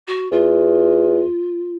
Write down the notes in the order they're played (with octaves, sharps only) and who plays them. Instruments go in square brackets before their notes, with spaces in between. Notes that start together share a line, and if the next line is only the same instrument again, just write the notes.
[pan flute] F#4
[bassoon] E2 [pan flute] F4